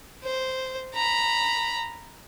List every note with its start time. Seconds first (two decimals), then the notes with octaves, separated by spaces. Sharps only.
0.23 C5
0.94 A#5 B5